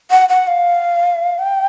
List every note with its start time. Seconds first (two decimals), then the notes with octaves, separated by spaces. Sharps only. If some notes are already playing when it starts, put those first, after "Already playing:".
0.11 F#5
0.29 F#5
0.48 F5
1.39 G5